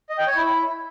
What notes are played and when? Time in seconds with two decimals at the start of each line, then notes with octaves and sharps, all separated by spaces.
0.09 D#5
0.18 G5
0.27 C#5
0.36 E4